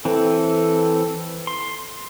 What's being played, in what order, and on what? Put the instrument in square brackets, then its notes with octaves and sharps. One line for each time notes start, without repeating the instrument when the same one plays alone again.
[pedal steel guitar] E3 C4 [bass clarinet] A4
[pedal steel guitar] C6